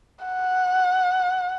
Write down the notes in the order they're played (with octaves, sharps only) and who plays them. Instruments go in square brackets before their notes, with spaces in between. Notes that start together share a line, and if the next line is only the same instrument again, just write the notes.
[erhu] F#5